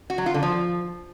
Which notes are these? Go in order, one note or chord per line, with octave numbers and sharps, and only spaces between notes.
F#4
F#3
F4
D3
F3